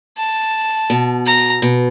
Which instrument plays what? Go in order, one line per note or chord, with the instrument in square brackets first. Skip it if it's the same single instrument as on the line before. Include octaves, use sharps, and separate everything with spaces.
[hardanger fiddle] A5
[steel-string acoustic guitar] B2
[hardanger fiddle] A#5
[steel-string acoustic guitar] B2